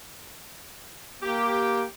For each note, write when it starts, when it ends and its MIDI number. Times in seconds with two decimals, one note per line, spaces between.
1.22 1.86 58
1.22 1.83 67